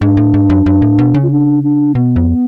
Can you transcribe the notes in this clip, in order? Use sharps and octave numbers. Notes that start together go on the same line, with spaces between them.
G#2 D4
A2
G#2
F#2
F#2
A2
B2
C#3
F4
D4
D4
B2 B3
F2